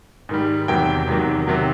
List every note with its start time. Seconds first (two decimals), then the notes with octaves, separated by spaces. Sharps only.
0.29 G#2 D#3 G3
0.68 E2 C3 D#3 F#3 G5
1.07 E2 C3 D#3 F#3
1.47 C3 D#3 F#3